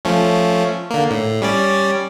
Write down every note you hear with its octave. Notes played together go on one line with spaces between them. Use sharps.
F3 A3 C#4
D3 A#3
A2
G3 C#4 D5